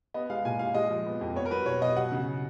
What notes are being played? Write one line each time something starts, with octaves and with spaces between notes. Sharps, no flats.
B3 D#5
G#3 F5
A#2 G#5
A#2 F5
G#3 D#5
F3
B3
F2
B3 C#5
A#4
F#3 B4
B2 C#5
B2 D#5
F#3 F#5
C#3